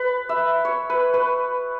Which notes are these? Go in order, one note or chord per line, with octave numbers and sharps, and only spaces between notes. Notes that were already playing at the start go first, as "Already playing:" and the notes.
Already playing: B4
E5
C#5
B4
B4